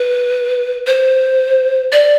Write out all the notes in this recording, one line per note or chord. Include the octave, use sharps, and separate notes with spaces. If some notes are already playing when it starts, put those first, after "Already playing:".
Already playing: B4
C5
D5